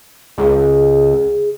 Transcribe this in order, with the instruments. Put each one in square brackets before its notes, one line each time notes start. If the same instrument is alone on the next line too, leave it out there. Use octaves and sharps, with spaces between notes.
[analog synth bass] C#2 [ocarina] G#4